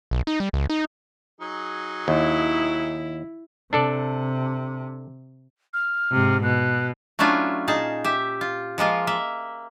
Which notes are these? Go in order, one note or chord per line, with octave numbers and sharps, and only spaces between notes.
B1
D#4
G3
C#2
D#4
F#3 D#4 G#4
D#2 E4
C3 D4 A4 D5
F6
G#2 C3
B2 F#6
F#3 A3 C#4 D4 E4 F4
A#2 D#4 G#4 A5
G4 E5
F4
F3 G#3 A#3 F4
A#3 E5